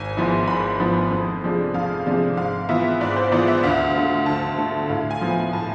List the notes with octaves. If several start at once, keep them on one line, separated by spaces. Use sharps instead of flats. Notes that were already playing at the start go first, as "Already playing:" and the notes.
Already playing: G#1 G#5
G#2 F3 B3 E4
G#1 B5
G#2 F3 B3 E4
F2
C3 F3 G#3 D4
F2 F5
C3 F3 G#3 D4
G#2 F5
E3 B3 F4 E5
G#2 D5
C5
E3 B3 F4 D5
E5
D2 F5
D3 A3
D2 A5
D3 A3
A2 F5
G#5
F3 B3
G#5
A2 A5